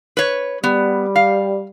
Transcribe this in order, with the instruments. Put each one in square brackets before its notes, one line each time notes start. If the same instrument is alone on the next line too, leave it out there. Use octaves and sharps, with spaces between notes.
[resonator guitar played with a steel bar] B4 C#5
[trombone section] G3 [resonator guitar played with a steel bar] B3
[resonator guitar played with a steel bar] F5